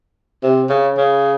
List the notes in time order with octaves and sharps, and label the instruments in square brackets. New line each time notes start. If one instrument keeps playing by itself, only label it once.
[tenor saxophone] C3
C#3
C#3